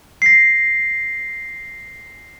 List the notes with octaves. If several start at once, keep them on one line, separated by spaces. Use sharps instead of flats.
A#6 C7